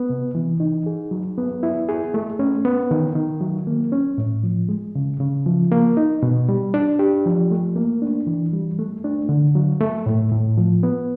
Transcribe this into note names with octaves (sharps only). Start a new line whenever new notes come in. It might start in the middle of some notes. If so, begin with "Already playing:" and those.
Already playing: B3
C3
E3
D#4
G#4
F#3
B3
E4
G#4
A3
C#4
B3
D#3
D#3
F#3
A#3
C#4
A2
F3
G#3
C#3
C#3
F3
A#3
D#4
B2
G3
D4
G4
F3
A3
A#3
D4
E3
G3
A3
D4
D3
F#3
A3
A2
A2
F3
B3